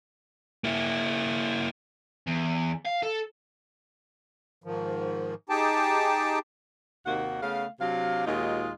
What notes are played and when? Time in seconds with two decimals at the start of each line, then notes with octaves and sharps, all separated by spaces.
0.64 A#3 E4
2.27 E2
2.85 F5
3.03 A4
4.64 G#2 D#3 F3
5.49 D#4 G4 G#4 G5 A5
7.06 D#2 C3 D#3 A#3 F#4 F#5
7.42 C#3 A3 B3 F5
7.80 C3 F#3 D4 F5
8.26 D#2 A#2 G#3 D#4 F4 F#4